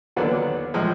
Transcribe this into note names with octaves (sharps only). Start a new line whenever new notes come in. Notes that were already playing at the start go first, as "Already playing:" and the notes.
D#2 D3 F#3 B3 D4
A2 F3 G#3